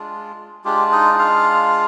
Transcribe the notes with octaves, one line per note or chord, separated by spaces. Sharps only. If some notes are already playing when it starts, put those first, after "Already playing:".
Already playing: G#3 D4 F4
G#3 D4 F4 G4
D#4 D#5
F4 F5